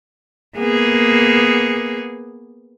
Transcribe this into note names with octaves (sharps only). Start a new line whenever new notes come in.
A#3 B3 G#4